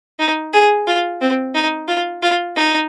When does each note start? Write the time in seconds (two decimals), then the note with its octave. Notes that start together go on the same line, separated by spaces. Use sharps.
0.20 D#4
0.53 G#4
0.87 F4
1.21 C4
1.55 D#4
1.88 F4
2.23 F4
2.56 D#4